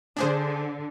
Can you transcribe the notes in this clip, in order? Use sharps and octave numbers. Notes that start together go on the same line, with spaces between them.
D3 D4 G#4 C5